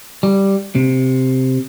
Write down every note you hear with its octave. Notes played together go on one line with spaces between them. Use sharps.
G3
C3